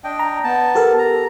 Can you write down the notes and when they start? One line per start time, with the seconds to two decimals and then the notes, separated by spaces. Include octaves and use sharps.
0.04 D4 D#5 G5
0.19 A#5
0.44 B3 A5
0.75 G4 A4 A#4
0.99 A#5